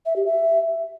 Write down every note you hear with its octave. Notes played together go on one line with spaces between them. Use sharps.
E5
G4
E5